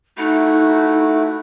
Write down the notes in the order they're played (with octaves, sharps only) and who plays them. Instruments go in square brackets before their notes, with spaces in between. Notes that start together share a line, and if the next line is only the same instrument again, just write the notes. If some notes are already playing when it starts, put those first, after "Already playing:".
[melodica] A3 E4 F#4 [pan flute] D#4